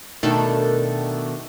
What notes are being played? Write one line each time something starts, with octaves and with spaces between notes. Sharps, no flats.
B2 D#3 A3 D4 A4